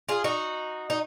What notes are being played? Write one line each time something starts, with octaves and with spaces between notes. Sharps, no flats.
F4 G#4
D#4 F#4
D#4